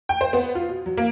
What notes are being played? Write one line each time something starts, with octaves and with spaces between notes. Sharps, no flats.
G5
C5
B3
F4
B2
F#3
A#3